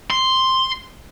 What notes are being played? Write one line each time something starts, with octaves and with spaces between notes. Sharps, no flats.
C6